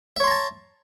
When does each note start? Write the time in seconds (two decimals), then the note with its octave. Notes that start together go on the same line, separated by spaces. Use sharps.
0.16 E5
0.20 C#5
0.24 C6
0.27 A#5
0.31 A5